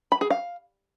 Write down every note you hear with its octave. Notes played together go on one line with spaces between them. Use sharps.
B5
G#4
F5